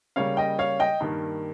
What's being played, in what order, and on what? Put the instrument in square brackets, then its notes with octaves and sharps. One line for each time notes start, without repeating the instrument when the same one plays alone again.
[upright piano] C#3 G3 A#3 C#5 F5
D#5 G5
C#5 F5
D#5 G5
G2 D#3 A#3